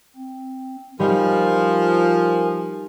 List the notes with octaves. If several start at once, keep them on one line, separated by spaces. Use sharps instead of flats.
C4
F3 G3 D#4 A#4 G#5